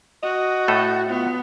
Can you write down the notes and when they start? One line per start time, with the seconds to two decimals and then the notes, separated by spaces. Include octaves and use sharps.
0.23 F#4 D#5
0.68 A2 A3 A4
1.10 B3 F4